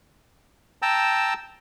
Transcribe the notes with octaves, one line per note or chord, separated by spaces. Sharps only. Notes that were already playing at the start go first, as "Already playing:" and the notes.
G5 A5 A#5 E6